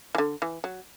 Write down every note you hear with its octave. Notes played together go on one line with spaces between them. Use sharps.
E3
D3
E3
F#3